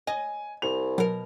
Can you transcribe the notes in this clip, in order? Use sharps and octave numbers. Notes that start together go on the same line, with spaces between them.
D#5 G#5
C2 F7
B2 F#3 A#4